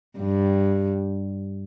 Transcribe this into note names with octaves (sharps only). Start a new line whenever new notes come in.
G2